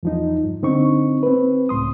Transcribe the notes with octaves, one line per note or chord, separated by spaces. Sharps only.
E2 F3 D#4
G2
D3 C4 D#4 C#6
C4 B4
C#2 A2 C6 D#6